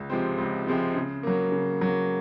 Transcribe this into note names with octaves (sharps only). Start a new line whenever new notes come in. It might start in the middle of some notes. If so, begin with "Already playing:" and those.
Already playing: C#2
C3 F3 G#3 C4
C#2
C3 F3 G#3 C4
C#3
F#3 A#3
C#3
F#3 A#3